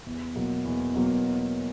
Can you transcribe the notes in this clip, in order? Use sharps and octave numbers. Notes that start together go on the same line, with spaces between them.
E2
B2 F#3 A#3
E2
B2 F#3 A#3